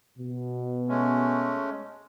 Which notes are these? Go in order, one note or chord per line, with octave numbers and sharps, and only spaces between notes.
B2
G#3 A3 C#4